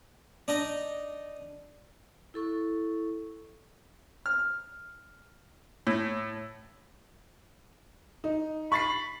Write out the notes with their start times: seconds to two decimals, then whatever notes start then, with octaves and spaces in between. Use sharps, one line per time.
0.48 D4 D#4 D#5
2.34 E4 A4 C#6
4.26 F6
5.87 A2
8.24 D#4
8.72 B5 C#6 A6 C7